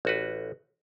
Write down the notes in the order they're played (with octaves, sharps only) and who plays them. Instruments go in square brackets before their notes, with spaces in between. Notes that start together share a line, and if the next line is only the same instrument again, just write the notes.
[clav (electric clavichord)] A1 F#4 B4